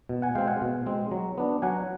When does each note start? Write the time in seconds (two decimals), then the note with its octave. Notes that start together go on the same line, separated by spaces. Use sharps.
0.09 B2
0.22 F#5 G#5
0.35 G#3 C4 F5 G5
0.48 F#5 G#5
0.61 B2
0.86 G#3 C4
1.11 F#3
1.38 B3 D4
1.62 F#3 F#5 G#5